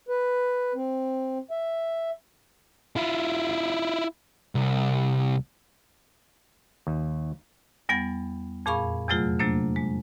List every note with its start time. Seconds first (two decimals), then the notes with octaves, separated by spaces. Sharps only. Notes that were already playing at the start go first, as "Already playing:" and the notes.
0.09 B4
0.75 C4
1.51 E5
2.96 E4 F4
4.55 C2
6.87 D#2
7.89 E2 G3 B3 F#5 A6
8.66 F2 A#2 G#4 F5 B5 C#6
9.09 E2 C3 F#3 A3 F4 G#4
9.39 C3 F#3 A3 A#3 D4
9.76 G#3